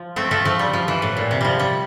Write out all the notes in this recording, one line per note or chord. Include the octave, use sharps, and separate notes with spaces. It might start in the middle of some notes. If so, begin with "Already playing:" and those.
Already playing: F3
A3 C4
F3 A3
F3 A3
G3
F3
E3
A2
A#2
C3
F3 G3
G3